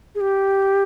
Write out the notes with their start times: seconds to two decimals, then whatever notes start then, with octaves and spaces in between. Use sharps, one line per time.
0.15 G#4
0.21 G4